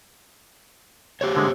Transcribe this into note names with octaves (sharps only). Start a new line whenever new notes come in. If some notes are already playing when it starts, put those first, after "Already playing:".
G4 C5 C#5
D3 G#3